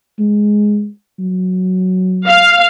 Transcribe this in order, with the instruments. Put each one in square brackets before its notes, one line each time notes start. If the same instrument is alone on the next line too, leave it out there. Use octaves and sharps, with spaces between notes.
[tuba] G#3
F#3
[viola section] F5